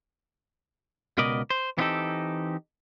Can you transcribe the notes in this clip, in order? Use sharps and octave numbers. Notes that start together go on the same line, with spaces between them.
C#2 B2 A#4 B4 D5 D#5
C5
E3 B3 C4 D#4 G4 A4